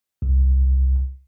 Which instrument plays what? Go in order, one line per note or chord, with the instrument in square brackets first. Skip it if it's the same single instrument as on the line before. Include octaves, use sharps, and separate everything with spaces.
[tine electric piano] C2